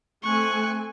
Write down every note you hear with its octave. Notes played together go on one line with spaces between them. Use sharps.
A3 C4 G#5 C#6 F#6